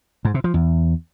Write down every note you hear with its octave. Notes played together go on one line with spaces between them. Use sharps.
G#2
C3
F3
E2